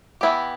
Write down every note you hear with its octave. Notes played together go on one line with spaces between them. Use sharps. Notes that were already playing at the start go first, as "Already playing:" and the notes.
E3 B3 E4 G4